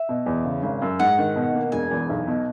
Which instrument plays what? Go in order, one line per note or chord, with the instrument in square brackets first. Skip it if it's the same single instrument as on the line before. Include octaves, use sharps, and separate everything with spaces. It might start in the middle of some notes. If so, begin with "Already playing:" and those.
Already playing: [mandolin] E5
[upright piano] B2
E2
C#3
G#1
F#2
[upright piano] G#2 [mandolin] F#5
[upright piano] D#3
B2
A#3
[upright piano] E1 [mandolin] G#5
[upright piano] E2
B1
B2